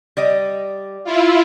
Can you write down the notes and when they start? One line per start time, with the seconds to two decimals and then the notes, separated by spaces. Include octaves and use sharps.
0.17 G3 D5 D#5
1.04 E4 F4